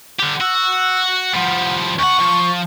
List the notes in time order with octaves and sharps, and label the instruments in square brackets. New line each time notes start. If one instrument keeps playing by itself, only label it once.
[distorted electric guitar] D3 G4
[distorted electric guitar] F#4 [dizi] E6
[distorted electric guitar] F3 G3 [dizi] F#5
[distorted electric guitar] D2 F#5 [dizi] C#6
[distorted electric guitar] F3